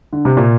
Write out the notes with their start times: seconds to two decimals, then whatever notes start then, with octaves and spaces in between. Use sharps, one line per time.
0.13 D3
0.25 C3
0.37 A#2